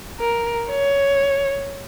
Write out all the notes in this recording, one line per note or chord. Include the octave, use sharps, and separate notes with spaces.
A#4
C#5